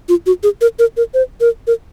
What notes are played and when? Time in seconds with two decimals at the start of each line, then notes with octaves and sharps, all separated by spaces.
0.09 F4
0.26 F#4
0.43 G#4
0.61 A#4
0.79 A#4
0.97 A#4
1.14 C5
1.41 A#4
1.67 A#4